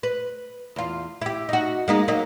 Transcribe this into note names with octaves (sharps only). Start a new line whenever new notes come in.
B4
E2 F4
E4 G4
D#4 F#4
G#3 A#3 D#4
F#3 A#3 D#4